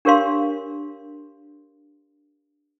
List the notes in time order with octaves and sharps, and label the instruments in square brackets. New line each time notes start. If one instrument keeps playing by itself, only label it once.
[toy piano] D4 G4 A#4 C#5 F5 C6